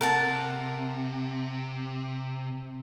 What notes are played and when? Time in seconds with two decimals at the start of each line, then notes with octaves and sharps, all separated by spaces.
0.01 C3 A#4 F#5 A5